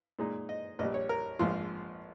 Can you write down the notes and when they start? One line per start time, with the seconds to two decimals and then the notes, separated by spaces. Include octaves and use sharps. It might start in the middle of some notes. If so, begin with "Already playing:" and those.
0.19 A#2 G#3 D#4
0.49 D#5
0.79 A#1 A#2 G3 D#5
0.94 C#5
1.09 A#4
1.39 A#1 G#2 F3 F4